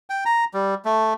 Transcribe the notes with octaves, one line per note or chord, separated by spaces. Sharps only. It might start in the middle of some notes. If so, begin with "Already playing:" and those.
G5
A#5
G3
A3